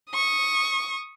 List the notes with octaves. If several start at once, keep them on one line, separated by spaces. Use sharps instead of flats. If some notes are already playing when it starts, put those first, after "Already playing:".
C#6 D#6